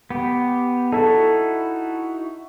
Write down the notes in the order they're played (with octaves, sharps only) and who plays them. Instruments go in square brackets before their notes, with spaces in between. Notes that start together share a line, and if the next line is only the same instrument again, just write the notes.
[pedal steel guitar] B3 G4
[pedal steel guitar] D#4 E4 F#4 [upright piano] A4